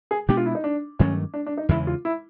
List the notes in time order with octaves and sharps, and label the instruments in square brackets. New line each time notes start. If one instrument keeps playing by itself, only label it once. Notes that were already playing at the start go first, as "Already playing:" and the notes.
[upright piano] G#4
[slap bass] B2 G#3 B3 D4 [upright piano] G4
[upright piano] F4
E4
D#4
D4
[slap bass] G2 D#3 F#3 A3 [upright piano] C#4
[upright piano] D4
D4
D#4
[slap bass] E2 C#3 E3 G#3 [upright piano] E4
[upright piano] F4
E4